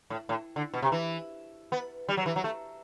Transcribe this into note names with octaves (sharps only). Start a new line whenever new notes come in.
A2
A2
D3
B2
C3
E3
B3
G3
F#3
E3
F#3
A3